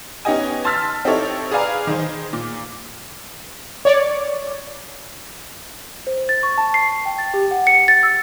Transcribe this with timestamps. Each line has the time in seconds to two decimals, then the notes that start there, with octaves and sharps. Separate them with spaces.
0.25 B3 C#4 D#4 G4 D#5 G#5
0.65 A5 C6 E6 F6 A6 B6
1.05 C4 D#4 E4 G4 A4 C#5
1.51 G#4 B4 D5 F5 G#5 A#5
1.87 D#3 G#4 C5
2.33 A#2
3.85 C#5 D5
6.07 C5
6.29 A6
6.43 C#6
6.58 A5
6.74 C7
7.05 G5
7.18 A6
7.34 G4
7.51 F#5
7.67 C#7
7.88 A6
8.03 E6